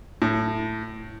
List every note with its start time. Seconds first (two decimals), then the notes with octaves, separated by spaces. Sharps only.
0.22 A2